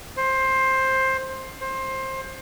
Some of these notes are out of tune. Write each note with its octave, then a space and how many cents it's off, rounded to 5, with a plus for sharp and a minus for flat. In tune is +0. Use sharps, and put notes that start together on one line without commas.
C5 +15
C5 +20